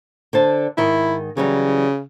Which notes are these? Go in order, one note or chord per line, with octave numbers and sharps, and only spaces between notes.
D3 C5 A5
G#2 D#3 E4
C#3 E3 F#3 G3